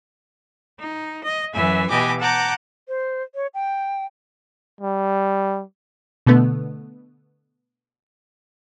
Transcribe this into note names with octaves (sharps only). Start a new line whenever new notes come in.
D#4
D#5
F#2 E3 E5 G#5
B2 E3 G4 D#5 G#5 D6
F#5 A5 A#5 D6 G6
C5
C#5
G5
G3
B2 D3 A3 B3